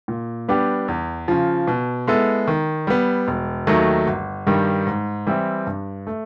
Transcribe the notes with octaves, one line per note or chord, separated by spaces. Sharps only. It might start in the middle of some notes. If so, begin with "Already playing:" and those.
A#2
G3 B3 D4 G4
E2
C#3 F3
B2
G#3 B3 E4 A4
D#3
G3 B3
E1
D#2 D#3 F#3 A3
G1
G2 D#3 G3
G#2
E3 G3 C4 E4
G2
A3